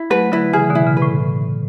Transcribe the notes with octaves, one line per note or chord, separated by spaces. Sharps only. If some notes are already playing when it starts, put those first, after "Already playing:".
Already playing: E4
F#3 A3 B4
D3 F#3 E4
C#3 E3 G#4
C#3
B2 D3
E4
C#3
B4
A2